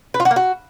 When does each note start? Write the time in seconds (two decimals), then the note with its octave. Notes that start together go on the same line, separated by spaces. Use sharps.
0.14 B4
0.20 F4
0.25 F#4
0.31 A#3
0.36 F#4